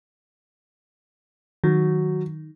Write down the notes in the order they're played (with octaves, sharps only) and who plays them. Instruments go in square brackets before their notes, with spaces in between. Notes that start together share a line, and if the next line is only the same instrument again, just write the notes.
[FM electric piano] D#3 [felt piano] F#3